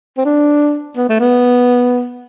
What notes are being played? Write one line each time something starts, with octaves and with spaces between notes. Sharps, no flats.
C4
D4
B3
A3
B3